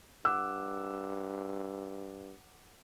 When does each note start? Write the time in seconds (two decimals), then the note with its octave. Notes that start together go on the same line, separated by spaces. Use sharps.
0.25 G2 F#5 D6 E6 F#6